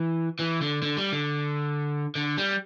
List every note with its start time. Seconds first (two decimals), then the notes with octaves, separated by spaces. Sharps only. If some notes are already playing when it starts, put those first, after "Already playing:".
Already playing: E3
0.39 E3
0.62 D3
0.83 D3
0.97 G3
1.13 D3
2.15 D3
2.38 G3